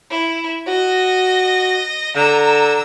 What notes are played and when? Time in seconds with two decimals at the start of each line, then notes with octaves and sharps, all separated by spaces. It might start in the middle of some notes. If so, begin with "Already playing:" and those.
0.11 E4
0.68 F#4 D#5
2.16 D3 A#5 E6